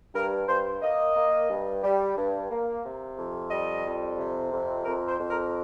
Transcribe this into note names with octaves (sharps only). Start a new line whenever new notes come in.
G2 A#4
G2 C5
A#3 D#5
A#3
G2
G3
G2
A#3
C3
F2
G3 D#5
F2
C3
F2
F2 A#4
C5
F2
A#4